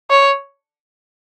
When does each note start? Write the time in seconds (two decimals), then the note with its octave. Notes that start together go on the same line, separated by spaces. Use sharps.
0.10 C#5